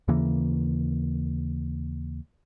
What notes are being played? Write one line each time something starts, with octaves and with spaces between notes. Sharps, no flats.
D#2 C#3 E3 A#3